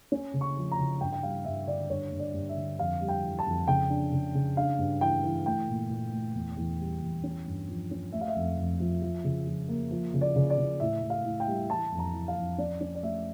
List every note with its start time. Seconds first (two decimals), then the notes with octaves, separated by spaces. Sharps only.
0.12 C#4
0.34 C#3
0.41 C#6
0.57 F3
0.72 A#5
0.78 C#3
1.00 G2 G5
1.12 G5
1.23 G3 F5
1.45 G2 E5
1.67 D3 D5
1.90 G2 C#5
2.12 G2
2.19 D5
2.34 G2
2.49 E5
2.57 D3
2.79 F2 F5
3.01 G3
3.08 G5
3.24 E3
3.39 A5
3.45 F2
3.68 C#3 G5
3.90 D4
4.12 C#3
4.35 C#3
4.57 D4 F5
4.78 G2
5.01 E3 G5
5.24 E3
5.46 A3 G5
5.68 A#2
5.90 A#2
6.12 A3
6.35 E2
6.57 E2
6.79 G3
7.02 E2
7.24 C#4
7.46 G2
7.68 F3
7.91 C#4
8.12 A3 E5
8.21 F5
8.28 E5
8.36 F2
8.57 F2
8.80 F3
9.02 F3
9.24 C#3
9.47 F3
9.68 A#3
9.91 F3
10.14 C#3
10.21 D5
10.36 C#3
10.50 D5
10.58 C#3
10.80 A2 E5
11.02 A2
11.10 F5
11.25 A2
11.40 G5
11.47 G3
11.70 E3 A5
11.91 F2
11.99 A#5
12.14 E3
12.28 F5
12.37 F2
12.58 C#4 D5
12.81 C#4
12.95 D5
13.02 A3 E5